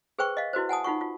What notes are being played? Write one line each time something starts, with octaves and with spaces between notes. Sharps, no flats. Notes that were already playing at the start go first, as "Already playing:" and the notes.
G#4 B4 C5 G5 C#6
D#5 F5
E4 F#4 B4 C5
F#5 G#5 A5 D#6
D#4 F4 F#5 C#6
F4